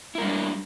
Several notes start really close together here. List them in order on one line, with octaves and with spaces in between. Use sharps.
E4 A#4 G3 D4